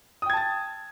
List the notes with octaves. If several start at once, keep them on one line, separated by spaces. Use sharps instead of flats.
G5 A5 D#6 G#6 A6